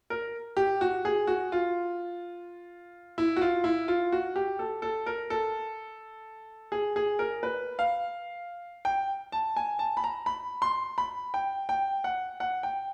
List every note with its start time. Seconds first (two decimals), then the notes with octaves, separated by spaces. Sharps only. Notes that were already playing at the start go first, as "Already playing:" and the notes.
0.10 A#4
0.57 G4
0.81 F#4
1.05 G#4
1.27 F#4
1.52 F4
3.18 E4
3.36 F#4
3.41 F4
3.64 E4
3.88 F4
4.12 F#4
4.36 G4
4.59 A4
4.82 A4
5.06 A#4
5.30 A4
6.72 G#4
6.96 G#4
7.19 A#4
7.43 B4
7.79 F5
8.85 G5
9.32 A5
9.56 G#5
9.79 A5
9.97 B5
10.04 A#5
10.26 B5
10.62 C6
10.98 B5
11.34 G5
11.69 G5
12.04 F#5
12.40 F#5
12.63 G5